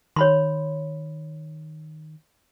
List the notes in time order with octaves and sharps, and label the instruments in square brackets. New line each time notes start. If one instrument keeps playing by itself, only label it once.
[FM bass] D#3 [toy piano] C#5 B5 C6